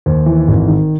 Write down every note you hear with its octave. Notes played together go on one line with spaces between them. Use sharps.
D#2 C5
E3
G#1
D#3